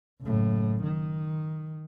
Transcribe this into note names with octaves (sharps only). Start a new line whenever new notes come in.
F#1 A2
D#3